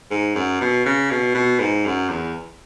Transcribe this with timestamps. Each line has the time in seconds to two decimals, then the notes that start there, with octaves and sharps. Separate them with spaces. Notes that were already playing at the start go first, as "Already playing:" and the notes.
0.11 G#2
0.36 F#2
0.62 B2
0.86 C#3
1.11 B2
1.35 B2
1.60 G#2
1.86 F#2
2.10 E2